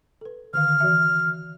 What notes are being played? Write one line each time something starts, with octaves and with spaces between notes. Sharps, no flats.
A4 B4
D3 D#3 F5 F6
E3 F#4 E5